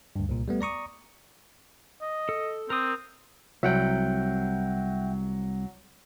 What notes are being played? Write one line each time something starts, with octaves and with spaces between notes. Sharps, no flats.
D2 G2
C2 A#2
G3 A3 B3
D5 A#5 C#6 D#6
D#5
A4
C4 A#4 D#6
C2 F#3 E5 F#5 G5